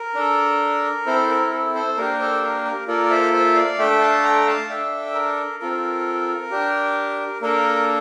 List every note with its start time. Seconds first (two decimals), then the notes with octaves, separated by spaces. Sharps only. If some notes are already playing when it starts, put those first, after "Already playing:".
Already playing: A#4
0.15 D4 A4
1.06 C4 E4 A4 C5
1.30 A#4
1.51 A4
1.74 A4 C5
1.97 A#3 D4 G4 A#4
2.20 A4 C5
2.43 A#4
2.65 A#4
2.88 A#3 F4 A4 A#4 D5
3.11 C5 E5
3.33 C5 E5
3.56 D5 F5
3.78 A3 D4 A4 E5 G5
4.01 F5 A5
4.24 G5 A#5
4.47 F5 A5
4.69 D4 A4 E5 G5
5.14 A#4
5.60 C4 F4 A4 A#4
6.51 D4 G4
7.42 A#3 D4 A4 A#4